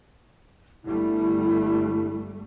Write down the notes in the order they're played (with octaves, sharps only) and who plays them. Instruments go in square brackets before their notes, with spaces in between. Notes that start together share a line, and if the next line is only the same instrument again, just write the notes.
[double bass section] G1 G3 A3 [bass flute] E4